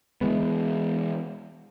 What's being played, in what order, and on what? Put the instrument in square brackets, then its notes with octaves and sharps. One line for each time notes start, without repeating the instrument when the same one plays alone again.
[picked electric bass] E3 G#3 B3